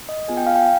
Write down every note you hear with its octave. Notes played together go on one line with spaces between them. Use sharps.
D#5
B3 F4 G#4 G#5
G5
F5
G5